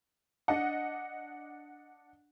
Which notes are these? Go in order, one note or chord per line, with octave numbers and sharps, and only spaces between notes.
D4 D#5 F#5